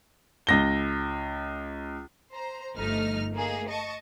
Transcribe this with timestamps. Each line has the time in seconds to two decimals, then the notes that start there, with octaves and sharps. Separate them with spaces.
0.47 C#2 A#6 G7
2.32 C5 A#5
2.76 G1 F3 A3 D#4 F6
3.32 A3 A#3 D#4 G#4
3.68 D#5 A5 C#6